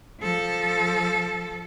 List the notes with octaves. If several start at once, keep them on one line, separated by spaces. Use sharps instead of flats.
F3 A4